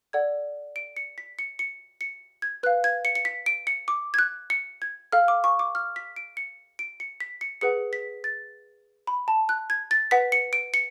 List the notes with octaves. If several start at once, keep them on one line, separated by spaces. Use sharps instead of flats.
A4 D5 F#5 G#6
D7
C#7
B6
C#7
C#7
C#7
G#6
B4 F5 F#6
G#6
C#7
C#7
B6
D7
C#7
D6
G#6
F#6
C#7
G#6
A4 F5 F6
D6
C#6
D6
F6
B6
D7
C#7
D7
C#7
B6
C#7
G#4 B4 F#5 C#7
B6
A6
B5
A5
F#6
G#6
A6
B4 F#5 B6
C#7
D7
C#7